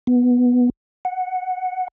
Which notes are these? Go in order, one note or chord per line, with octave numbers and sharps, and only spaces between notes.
B3
F#5